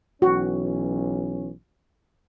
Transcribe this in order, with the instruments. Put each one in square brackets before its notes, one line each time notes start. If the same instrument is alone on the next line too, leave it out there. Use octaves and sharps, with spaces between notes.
[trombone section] B1 E3 C#4 [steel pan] F#4